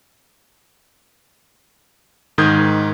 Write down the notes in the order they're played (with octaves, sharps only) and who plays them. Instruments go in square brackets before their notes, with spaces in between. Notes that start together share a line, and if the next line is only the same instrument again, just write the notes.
[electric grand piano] G#2 D#3 D#6 G6 G#6